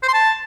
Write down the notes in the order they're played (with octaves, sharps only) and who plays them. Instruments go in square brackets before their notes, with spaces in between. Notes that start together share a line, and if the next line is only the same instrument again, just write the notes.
[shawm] C5
C6
A5